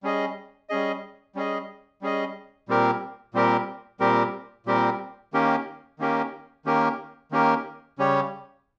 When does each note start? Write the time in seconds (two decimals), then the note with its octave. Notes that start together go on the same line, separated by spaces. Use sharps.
0.03 G3 C#4 G#4 D#5
0.69 G3 C#4 G#4 D#5
1.35 G3 C#4 G#4 D#5
2.01 G3 C#4 G#4 D#5
2.68 A#2 G3 C4 G4 A#4
3.34 A#2 G3 C4 G4 A#4
4.00 A#2 G3 C4 G4 A#4
4.66 A#2 G3 C4 G4 A#4
5.33 D#3 A#3 C#4 G4 A#4
5.99 D#3 A#3 C#4 G4 A#4
6.65 D#3 A#3 C#4 G4 A#4
7.31 D#3 A#3 C#4 G4 A#4
7.98 C#3 G3 C#4 G4 C#5